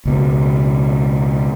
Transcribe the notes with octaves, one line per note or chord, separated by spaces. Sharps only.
C#2 B2